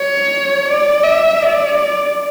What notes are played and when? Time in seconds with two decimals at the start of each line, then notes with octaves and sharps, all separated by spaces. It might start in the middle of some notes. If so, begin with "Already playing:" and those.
Already playing: C#5
0.66 D5
1.04 E5
1.42 D5